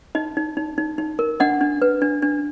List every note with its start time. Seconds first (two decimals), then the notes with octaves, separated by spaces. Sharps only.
0.15 D#4 D#5
0.37 D#4
0.57 D#4
0.78 D#4
0.98 D#4
1.19 A#4
1.40 D4 D#5 F#5
1.61 D4
1.82 B4
2.02 D4
2.22 D4